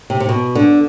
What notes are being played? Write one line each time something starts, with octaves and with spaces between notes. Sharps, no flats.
C3
C3
B2
D3